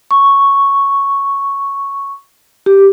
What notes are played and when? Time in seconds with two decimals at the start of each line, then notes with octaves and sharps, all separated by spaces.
0.11 C#6
2.66 G4